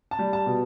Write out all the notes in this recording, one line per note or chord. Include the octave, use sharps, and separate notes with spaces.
A5
G3
A5
B2